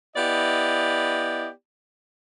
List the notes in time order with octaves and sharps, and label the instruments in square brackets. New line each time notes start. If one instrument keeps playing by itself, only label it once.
[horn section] B3 E4 G4 D5 D#5